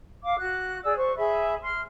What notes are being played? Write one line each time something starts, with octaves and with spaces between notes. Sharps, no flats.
F5 D6
F#4 F#6
G#4 D5 E6
C5 C#6
G#4 E5 B5
C6 F6